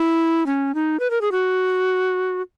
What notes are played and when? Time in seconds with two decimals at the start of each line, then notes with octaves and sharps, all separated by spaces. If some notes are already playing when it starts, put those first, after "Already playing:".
Already playing: E4
0.46 C#4
0.75 D#4
1.00 B4
1.11 A#4
1.21 G#4
1.32 F#4